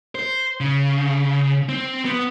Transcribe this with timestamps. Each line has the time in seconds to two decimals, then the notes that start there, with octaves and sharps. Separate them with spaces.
0.15 C5
0.60 C#3
1.69 C4
2.05 B3